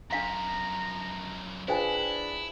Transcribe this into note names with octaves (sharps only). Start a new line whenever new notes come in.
F#2 F3 D4 F5 A#5 C6
D4 E4 F4 G#4 B4 C5 G5 G#5